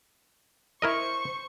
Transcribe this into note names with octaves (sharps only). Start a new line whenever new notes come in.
E4 A#4 C5 D#5 C#6